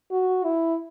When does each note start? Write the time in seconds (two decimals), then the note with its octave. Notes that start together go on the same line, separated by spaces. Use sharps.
0.11 F#4
0.44 E4